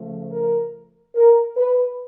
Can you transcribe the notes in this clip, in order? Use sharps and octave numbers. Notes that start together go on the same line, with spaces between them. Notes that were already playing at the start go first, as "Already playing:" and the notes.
Already playing: C#3 F3 A3
A#4
A#4
B4